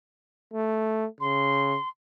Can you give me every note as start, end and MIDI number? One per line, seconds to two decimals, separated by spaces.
0.53 1.06 57
1.20 1.76 49
1.20 1.88 84